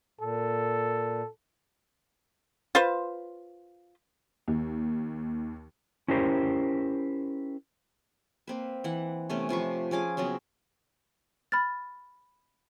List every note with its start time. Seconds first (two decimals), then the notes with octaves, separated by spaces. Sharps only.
0.21 A#2 A4
2.75 F4 B4 C5
4.48 D#2
6.08 C#4 E4 G4 A#4 C5
8.47 A#3 C4 B4
8.84 E3 F#5
9.29 C3 A3 B3 C#4
9.49 C3 F3 B4 C#6
9.91 F3 C#4 G#4 D6
10.17 C#3 F#3 B3 C4
11.52 B5 F6 A6